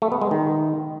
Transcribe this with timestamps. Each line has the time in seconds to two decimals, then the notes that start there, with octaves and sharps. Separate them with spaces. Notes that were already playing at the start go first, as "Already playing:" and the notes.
0.02 A3
0.12 B3
0.21 G#3
0.31 D#3